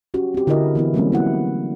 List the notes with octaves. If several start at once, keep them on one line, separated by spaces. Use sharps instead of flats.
C#4 F#4 G4
C4 G4
D3 E4 F#4 A#4 D#5
E3 B3 E4
F#3 G3 A3 A#3 C4 C#4
B3 E4 F#5